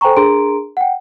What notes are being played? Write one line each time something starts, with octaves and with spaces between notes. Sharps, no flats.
A4 C5 G5 G#5 A#5 C#6
D4 G#4 A#4 A#5 C6 D7
F#5 G5